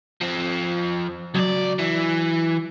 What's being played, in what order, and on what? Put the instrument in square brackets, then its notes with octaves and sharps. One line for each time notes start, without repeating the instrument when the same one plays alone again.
[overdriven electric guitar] F3 C4
[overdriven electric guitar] C#2 D5 [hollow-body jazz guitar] F#3
[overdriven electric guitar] E3